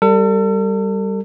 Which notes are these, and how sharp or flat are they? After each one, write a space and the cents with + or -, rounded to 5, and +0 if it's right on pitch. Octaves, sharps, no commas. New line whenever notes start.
G3 +0 A4 +40